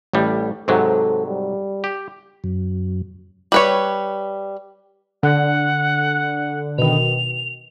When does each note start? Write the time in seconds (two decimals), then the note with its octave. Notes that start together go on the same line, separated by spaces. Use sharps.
0.13 A1 A2 G3
0.68 G#2 C3 F#3 A4
1.27 G3
1.84 G4
2.44 F#2
3.52 G3 B4 C#5
5.23 D3 F#5
6.78 B2 D#3 F7